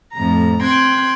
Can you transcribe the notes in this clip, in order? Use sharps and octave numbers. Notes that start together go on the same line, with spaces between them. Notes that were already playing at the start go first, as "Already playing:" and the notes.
F2 A2 A#5
C4 G5 C6 F#6 G#6